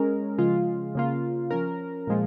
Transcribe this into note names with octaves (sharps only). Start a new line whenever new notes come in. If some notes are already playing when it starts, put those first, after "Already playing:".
Already playing: G#3 C#4 A#4
C#3 F3 G#3 F4
C#3 A#3 F4
F3 C#4 A#4
A#2 F3 G#3 F4